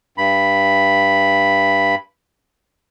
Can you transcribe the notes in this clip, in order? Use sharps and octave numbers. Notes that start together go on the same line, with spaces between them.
G2 B5